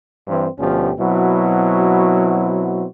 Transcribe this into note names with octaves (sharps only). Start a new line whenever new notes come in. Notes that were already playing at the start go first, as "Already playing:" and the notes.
G2 E3 C4
D2 B2 F3 C#4 G4
B2 F#3 C4 E4 F#4